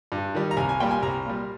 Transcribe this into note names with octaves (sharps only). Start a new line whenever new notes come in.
G2
D#3 G3
A#5
C2 G#5
G#5
A#2 G3 G5
G#5
C2 A#5
A#2 G3